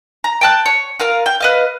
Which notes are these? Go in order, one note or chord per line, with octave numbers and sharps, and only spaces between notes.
A#5
G5 A5 F#6
C#5
F4 A#4 F5
G5
B4 D#5 F5